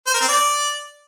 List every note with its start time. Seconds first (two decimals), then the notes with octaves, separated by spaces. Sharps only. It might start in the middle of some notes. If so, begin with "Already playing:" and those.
0.07 C5
0.14 A#4
0.21 C4
0.28 D5